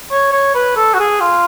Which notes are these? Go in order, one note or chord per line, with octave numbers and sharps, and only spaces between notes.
C#5
C#5
B4
A4
F#4
G#4
F4